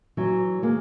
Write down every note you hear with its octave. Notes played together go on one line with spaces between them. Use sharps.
E3 F#3
G#3 A#3